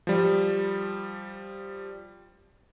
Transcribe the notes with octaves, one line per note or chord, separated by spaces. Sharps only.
F3 G3